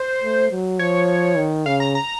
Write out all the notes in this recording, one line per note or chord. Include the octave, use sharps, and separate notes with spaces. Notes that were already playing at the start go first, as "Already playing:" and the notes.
Already playing: C5
A3
F#3
F3 C#5
D#3
C#3 F5
A#5
A#5